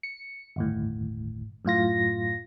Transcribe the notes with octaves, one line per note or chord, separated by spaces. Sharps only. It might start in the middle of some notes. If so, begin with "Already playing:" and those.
C#7
G1 D#2 A2
F#2 A2 F4 A#6